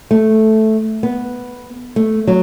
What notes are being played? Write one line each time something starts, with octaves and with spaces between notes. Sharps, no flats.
A3
B3
A3
F#3